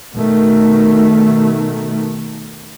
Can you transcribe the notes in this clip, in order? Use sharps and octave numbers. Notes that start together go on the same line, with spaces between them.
B2 D#3 A3